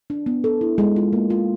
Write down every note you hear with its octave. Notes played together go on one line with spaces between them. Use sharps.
D4
B3
A4
E4
G#3
F4
A#3
F4